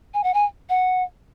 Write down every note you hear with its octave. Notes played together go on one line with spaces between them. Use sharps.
G#5
F#5
G#5
F#5